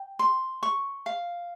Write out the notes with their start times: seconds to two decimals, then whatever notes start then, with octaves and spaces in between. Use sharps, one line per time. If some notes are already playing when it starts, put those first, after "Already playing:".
Already playing: G5
0.19 C6
0.63 C#6
1.06 F5